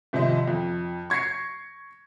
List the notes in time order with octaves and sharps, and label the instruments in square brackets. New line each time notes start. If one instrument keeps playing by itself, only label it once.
[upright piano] G#1 C3 F3 D#5 E5
F2
C#6 G#6 A#6 C7 C#7